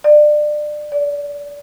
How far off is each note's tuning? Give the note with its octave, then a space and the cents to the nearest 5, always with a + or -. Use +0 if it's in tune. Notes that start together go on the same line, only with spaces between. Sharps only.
D5 +25
D5 -30